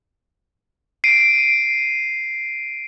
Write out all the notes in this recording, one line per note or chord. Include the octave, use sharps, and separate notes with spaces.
C7 D7 D#7